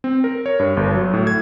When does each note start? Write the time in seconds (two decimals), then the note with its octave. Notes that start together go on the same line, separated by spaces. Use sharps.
0.04 C4
0.24 A#4
0.46 C#5
0.60 G2
0.77 G1
0.94 F#3
1.14 A2
1.27 G#6